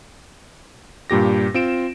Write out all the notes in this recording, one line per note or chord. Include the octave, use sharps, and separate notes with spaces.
G2 A#2 G4 A#6
C4 F4 D7 E7